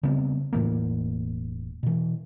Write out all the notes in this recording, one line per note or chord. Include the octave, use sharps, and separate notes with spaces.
C#3 G3 B3 C4
E1 A2 E3 A#3
B2 E3